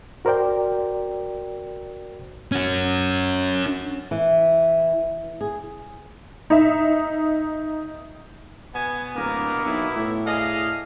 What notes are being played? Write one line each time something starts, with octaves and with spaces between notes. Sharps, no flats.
F#4 A#4 C5 D5 G5
C#4 F#4
E3
G#4
D#4 E5
B2 B3 G#5
D1 A#3 A#4
B1 E4
A2
G#4 A4 D5 D#5 F5